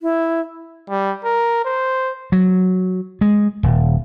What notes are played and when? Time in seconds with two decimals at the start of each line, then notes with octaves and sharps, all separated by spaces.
0.01 E4
0.90 G3
1.25 A#4
1.65 C5
2.32 F#3
3.21 G#3
3.63 D#1